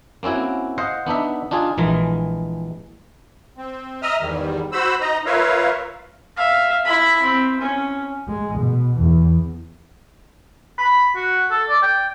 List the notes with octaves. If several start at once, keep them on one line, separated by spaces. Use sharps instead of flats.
A#3 C4 C#4 E4 F#4
C5 D#5 F5 F#5
B3 D4 D#4 E5
D4 D#4 F4 G#4
A#1 E3 G#3 A#4
C4
D#5 E5 A#5 D#6 F6
E2 G#2 D#3 G3
F#4 C5 B5 E6
D#4 D#5 A#5
F4 A#4 B4 C#5 E5 F5
E5 F5
E4 B5
C4
C#4
G#3
B2
E2
B5
F#4
A4
D5
G5